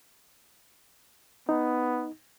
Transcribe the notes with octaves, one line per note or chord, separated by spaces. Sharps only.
B3 D#4